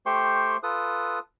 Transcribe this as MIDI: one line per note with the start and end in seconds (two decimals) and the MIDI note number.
0.06 0.57 57
0.06 0.57 67
0.06 0.57 72
0.06 0.57 79
0.06 0.57 84
0.06 0.57 85
0.63 1.19 65
0.63 1.19 69
0.63 1.19 71
0.63 1.19 87